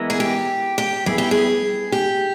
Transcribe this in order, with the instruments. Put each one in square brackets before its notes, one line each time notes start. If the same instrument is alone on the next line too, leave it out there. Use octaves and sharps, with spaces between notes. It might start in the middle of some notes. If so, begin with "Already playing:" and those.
Already playing: [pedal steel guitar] E3 G#3 B3 E4 A#4
[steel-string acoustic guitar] G#4
G4
G4
[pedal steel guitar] G3 B3 E4 [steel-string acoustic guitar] G#4
[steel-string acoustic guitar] G4
G#4
G4